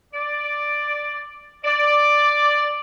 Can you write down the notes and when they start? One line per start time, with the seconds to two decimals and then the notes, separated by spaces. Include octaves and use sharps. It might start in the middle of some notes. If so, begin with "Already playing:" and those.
0.14 D5
1.64 D5